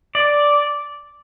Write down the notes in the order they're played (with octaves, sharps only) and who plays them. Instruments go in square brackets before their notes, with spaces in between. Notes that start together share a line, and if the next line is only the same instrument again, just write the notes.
[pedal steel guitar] D5